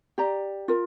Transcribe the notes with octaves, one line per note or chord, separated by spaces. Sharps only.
G4 D5 A#5
F4 A#4